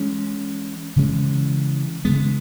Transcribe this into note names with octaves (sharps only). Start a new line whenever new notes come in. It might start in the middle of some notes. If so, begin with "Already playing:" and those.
Already playing: E3 G#3 C#4
C#3 E3 G#3 C#4
C#3 E3 G#3 B3